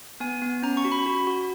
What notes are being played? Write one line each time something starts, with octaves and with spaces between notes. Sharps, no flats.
B3 G#5
B3
C#4 A#5
C#6
F#4
B5
F#4
F#4